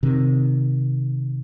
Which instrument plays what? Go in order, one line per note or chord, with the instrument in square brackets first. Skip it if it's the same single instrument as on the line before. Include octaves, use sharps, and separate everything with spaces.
[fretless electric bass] C3 D#3